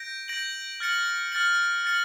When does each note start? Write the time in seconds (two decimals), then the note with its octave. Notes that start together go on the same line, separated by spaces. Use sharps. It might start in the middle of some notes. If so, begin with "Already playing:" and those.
Already playing: G6 A#6 D7
0.28 G6 A#6 D7 F#7
0.80 F6 A6 C#7 F#7
1.32 F6 A6 C#7 F#7
1.84 F6 A6 C#7 F#7